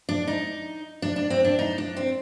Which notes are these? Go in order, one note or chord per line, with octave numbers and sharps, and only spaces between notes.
D4
D#4
D4
D4
C4
D4
D#4
D4
C4